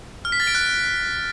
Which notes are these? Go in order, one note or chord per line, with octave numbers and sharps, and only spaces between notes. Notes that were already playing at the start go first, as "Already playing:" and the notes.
F6
B6
A6
D7
F#6